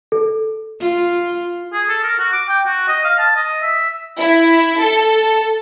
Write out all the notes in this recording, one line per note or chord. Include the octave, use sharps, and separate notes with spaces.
A4
F4
G#4
A4
A#4
F#4
D6
G5
F#4
D#5
F5
A5
D#5
E5
E4
A4